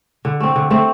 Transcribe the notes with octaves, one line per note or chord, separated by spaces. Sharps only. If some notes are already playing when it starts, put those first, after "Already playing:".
D3
A3 C4
D3
A3 C4